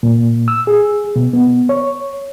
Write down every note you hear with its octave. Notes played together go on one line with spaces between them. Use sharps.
A#2
E6
G#4
B2
B3
C#5